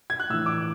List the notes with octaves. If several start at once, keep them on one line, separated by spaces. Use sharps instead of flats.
G#6
F#6
A2 E3 E6
D6